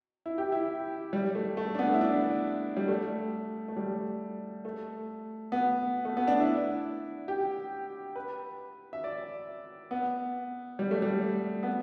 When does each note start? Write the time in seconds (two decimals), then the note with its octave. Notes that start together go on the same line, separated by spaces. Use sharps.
0.26 E4
0.38 G4
0.52 E4
1.13 G3
1.35 A3
1.57 A3
1.75 D4
1.79 B3
1.94 E4
2.01 D4
2.77 G3
2.88 A3
3.68 A3
3.76 G3
4.65 A3
5.52 B3
6.05 A3
6.17 B3
6.27 D4
6.40 E4
7.28 G4
8.16 B4
8.93 E5
9.04 D5
9.91 B3
10.79 G3
10.91 A3
11.02 G3
11.63 B3